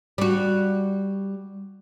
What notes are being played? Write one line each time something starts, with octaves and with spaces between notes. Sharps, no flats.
G3 F#4